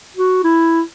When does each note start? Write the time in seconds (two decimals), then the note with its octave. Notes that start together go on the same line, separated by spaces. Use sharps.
0.17 F#4
0.44 E4